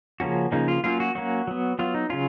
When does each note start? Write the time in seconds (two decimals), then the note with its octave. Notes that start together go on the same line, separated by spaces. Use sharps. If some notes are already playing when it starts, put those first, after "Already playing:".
0.20 C#3 F3 A#3 C#4 F#4
0.52 C#3 F3 A#3 C#4 D#4
0.68 F4
0.84 F#3 A#3 C#4 F4
1.00 F#4
1.15 F#3 A#3 C#4 F#4
1.47 F#3 B3
1.79 F#3 B3 F4
1.94 D#4
2.10 C#3 F#3 C#4 F4